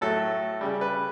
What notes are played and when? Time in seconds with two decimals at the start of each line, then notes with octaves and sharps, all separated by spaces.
0.01 A2 F#3 A3 A4
0.61 C#3 G3
0.81 B4